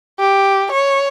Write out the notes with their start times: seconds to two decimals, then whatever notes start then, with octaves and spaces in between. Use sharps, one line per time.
0.19 G4
0.72 C#5